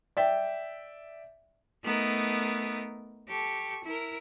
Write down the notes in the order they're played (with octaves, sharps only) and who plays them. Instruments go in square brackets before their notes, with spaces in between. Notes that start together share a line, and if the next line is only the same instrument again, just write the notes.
[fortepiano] D5 E5 G5
[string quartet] A3 B3 D#4 A#4
G4 A4 C#6
E4 A#4